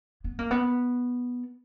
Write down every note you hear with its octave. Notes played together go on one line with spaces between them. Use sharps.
B3
A#3
B3